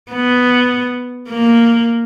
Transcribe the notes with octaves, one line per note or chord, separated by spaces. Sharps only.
B3
A#3